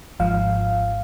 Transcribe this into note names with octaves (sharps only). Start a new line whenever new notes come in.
G#1 G#2 F3 F5